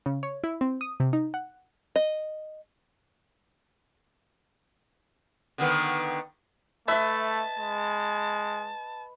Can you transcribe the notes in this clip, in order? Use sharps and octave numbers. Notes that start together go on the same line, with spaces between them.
C#3
C#5
E4
C4
D#6
C3
D#4
F#5
D#5
D3 D#3 B3
A3 B4 D#5 E5 A5
G#3